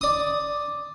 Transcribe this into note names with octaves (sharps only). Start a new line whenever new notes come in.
D5 D#6